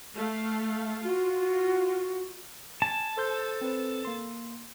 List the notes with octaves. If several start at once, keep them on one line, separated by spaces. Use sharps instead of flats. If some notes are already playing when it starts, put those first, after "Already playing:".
A3 F5
F4 F#4
G#5 A5
A4 C5 C6 G6
C4 B4 C5
A#3 C6